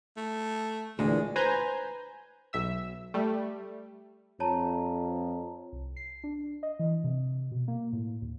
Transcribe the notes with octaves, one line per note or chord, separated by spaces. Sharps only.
A3
D2 A#2 E3 G#3
B4 C5 G#5 A#5 G6
B1 E5 E6
G3 A3
F2 C#5 A5 A#5
C2
C7
D4
D#5
E3
C3
B2
A#3
A2
D#2